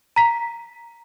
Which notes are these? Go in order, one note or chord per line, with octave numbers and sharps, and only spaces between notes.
A#5 B6